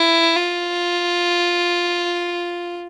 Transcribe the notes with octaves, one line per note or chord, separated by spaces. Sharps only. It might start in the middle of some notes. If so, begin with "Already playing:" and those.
Already playing: E4
F4